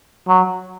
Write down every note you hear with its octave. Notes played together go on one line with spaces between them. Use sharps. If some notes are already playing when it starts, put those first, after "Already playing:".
F#3